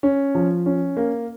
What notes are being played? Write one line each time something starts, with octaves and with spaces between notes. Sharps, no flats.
C#4
F3
C#4
A#3